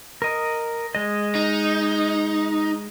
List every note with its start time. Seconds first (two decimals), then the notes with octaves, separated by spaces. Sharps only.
0.22 A#4 D#5
0.95 G#3 D#5
1.35 D#4